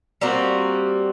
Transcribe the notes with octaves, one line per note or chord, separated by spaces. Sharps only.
G3 A#3 C4 F#4